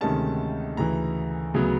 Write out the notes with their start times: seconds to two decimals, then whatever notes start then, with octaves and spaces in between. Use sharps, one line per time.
0.01 D2 C3 D#3 G#3 C#4 A5
0.77 D2 C#3 E3 A#5
1.54 D2 C#3 F#3 B3